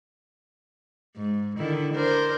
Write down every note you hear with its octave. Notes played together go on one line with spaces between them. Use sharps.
G#2
D3 D#3 E4
D4 A#4 C5